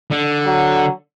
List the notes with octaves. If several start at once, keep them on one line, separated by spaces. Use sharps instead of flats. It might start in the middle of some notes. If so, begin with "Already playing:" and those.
D3
F#3